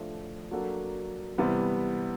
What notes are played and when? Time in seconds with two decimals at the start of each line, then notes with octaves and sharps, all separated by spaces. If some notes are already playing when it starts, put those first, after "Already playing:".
Already playing: A2 F3 A3 D4
0.51 F#3 A#3 D4 F#4 A4
1.38 C3 E3 G3 B3